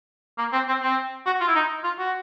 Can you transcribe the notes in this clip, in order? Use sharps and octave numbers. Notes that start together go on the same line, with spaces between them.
A#3
C4
C4
C4
F#4
F4
E4
D#4
F4
F#4